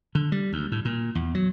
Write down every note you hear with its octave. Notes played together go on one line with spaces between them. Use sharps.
D3
G3
D2
A2
A#2
E2
F#3